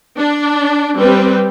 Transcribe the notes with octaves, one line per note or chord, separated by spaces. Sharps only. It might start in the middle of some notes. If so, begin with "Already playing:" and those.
D4
G3 C4 B4